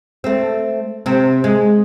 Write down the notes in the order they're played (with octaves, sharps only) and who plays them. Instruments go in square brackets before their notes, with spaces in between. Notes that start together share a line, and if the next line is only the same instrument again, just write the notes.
[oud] A3 C4
C3 C4
G#3